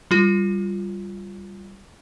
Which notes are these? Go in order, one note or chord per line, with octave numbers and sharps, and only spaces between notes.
G3 F4